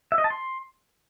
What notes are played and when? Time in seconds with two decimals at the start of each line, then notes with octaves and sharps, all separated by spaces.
0.12 E5
0.18 D#5
0.24 A5
0.30 C6